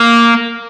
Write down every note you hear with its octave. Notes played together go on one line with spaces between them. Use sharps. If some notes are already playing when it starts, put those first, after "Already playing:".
Already playing: A#3